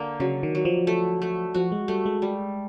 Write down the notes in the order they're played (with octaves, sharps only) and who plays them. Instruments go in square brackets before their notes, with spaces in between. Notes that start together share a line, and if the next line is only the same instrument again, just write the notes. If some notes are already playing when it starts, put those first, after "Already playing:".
Already playing: [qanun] D3 A#3
[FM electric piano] C#3 [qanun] F#3
[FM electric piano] D#3
[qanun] F#3
[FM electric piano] F3
[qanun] A3
A3
[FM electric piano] F3 [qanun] F#4
[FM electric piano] G#3
[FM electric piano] G3 [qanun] A3
[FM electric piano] G#3
[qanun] G3